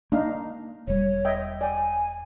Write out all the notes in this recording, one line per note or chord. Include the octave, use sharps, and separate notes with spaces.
A#3 D4 D#4 F5
E1 G3 C#5
D#5 E5 G5
D5 G5 G#5